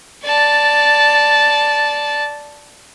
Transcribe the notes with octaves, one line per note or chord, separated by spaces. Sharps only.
D5 A5